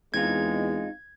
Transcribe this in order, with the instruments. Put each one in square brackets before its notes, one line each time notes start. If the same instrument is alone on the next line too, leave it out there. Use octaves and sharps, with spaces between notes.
[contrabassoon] E2 [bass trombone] G#3 [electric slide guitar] C4 D#4 F4 [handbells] G#6